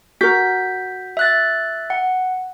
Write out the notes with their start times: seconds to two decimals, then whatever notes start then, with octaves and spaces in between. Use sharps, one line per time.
0.21 F#4 A#4 G6 B6
1.17 E5 F#6 A6
1.90 F#5